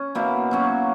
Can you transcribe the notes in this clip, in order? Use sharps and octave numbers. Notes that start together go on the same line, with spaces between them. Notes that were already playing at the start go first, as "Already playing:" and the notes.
Already playing: C#4
B2 A#3 E4
F#3 C#4 F#4